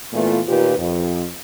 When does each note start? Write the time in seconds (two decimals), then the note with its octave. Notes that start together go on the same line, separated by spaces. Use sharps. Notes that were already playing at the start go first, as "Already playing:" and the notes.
0.13 A#2 E3 A3 B3 F4
0.48 A#2 D#3 F4 G4 B4
0.78 F2